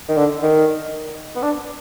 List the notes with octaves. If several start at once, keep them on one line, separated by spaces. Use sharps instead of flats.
D#3
D3
D#3
B3
D4